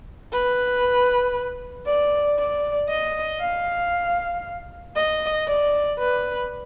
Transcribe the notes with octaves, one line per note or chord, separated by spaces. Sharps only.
B4
D5
D5
D#5
F5
D#5
D5
B4